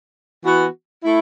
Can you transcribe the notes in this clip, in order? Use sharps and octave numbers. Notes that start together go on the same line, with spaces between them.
E3 B3 F#4
A3 E4